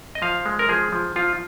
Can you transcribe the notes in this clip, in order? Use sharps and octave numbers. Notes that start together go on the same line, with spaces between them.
D#5
F3 F5
G#3
A#4
F3 G#4
F3
F3 F4